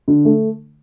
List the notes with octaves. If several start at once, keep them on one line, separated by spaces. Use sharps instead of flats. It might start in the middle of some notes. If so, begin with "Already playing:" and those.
D3
A3